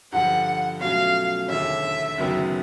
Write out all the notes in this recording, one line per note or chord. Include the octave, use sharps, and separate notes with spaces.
G2 D3 F3 F#5
B2 F#3 A3 C#4 F4 F5
E1 D#2 D3 E5
F#1 F#2 D#3 F#3 B3